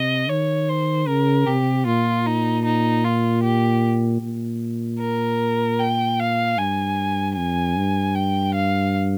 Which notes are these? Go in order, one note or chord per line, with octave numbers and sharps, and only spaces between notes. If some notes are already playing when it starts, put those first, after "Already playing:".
Already playing: C3 D#5
D#3 C#5
C5
C#3 A#4
C3 G4
A#2 F4
D#4
D#4
F4
G4
A#2
A#4
G5
F5
G2 G#5
F2 G#5
G2
G5
F5